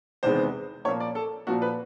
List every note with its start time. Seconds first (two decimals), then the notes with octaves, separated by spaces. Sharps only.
0.23 E2 C3 D#3 G#3 B3 C5
0.85 A#2 F3 A#3 C#5
1.00 D5
1.15 A4
1.47 A#2 F3 A#3 F#4
1.62 B4